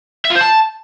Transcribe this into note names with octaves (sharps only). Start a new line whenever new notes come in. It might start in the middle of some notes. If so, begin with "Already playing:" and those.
E5
F4
C5
A5